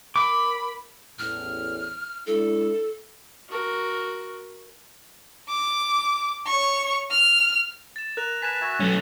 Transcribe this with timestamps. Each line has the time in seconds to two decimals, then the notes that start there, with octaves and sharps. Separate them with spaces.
0.16 A#4 B5 D6
1.19 A1 E2 A2 F6
2.27 G#3 D4 E4 A4
3.49 F#4 A#4
5.49 D6
6.47 C#5 C#6
7.11 F6
7.96 A6 E7
8.17 A#4 F#6 A#6 F7
8.42 B4 G#5 A5 B6 E7
8.61 F#4 E5 G#5
8.80 F#3 A3 C#4 F#6